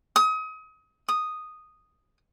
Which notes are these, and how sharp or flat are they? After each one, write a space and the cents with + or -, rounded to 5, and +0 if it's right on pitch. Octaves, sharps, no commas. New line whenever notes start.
D#6 +30
D#6 -5